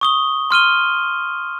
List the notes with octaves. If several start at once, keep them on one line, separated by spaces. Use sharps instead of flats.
C#6 D#6 G7
C6 F6 D#7 G7